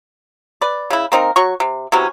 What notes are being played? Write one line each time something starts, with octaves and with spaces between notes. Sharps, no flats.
B4 D5
C#3 E4
A#3 C4 D#4 A#4
F#3 C#6
C3
C3 E3 F#3 C#4